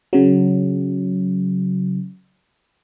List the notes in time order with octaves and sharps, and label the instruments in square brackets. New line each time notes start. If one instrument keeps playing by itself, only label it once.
[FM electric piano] C#3 F#3